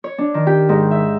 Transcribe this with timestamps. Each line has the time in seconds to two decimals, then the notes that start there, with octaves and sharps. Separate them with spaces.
0.04 C#5
0.18 D4
0.34 D#3
0.47 G4
0.69 G#2
0.91 E5